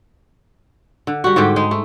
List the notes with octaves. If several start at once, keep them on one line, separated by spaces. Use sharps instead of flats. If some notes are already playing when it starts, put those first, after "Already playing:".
D3
G3 F#4
G#2 D3 G3 G4
G#3 D#4
A3